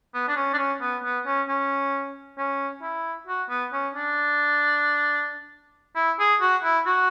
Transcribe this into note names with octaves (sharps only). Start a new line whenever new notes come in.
B3
D4
C#4
D4
C#4
B3
B3
C#4
C#4
C#4
E4
F#4
B3
C#4
D4
E4
G#4
F#4
E4
F#4